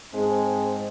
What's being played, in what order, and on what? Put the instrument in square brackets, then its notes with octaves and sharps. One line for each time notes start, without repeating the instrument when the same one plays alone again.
[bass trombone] G#2 [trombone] G#3 [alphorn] C4 [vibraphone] G#4 G5 A5